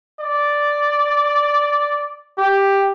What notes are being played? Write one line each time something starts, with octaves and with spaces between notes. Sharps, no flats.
D5
G4